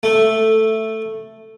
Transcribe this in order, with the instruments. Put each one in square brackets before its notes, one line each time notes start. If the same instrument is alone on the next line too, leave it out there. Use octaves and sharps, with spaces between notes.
[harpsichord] A3